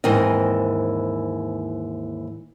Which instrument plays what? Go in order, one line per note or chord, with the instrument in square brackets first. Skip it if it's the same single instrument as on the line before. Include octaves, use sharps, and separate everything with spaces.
[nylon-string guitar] D#2 G#2 E3 C4 A#4 D#5